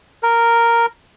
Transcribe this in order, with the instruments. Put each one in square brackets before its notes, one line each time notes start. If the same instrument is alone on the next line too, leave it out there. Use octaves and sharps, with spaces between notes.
[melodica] A#4